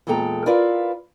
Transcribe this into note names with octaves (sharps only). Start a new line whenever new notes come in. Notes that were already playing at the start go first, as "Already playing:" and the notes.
E2 A#2 G#3 A4 G5 A#5
E4 F4 A#4 B4 D5 F5